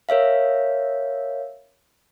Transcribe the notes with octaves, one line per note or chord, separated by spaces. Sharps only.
A#4 C#5 E5 F5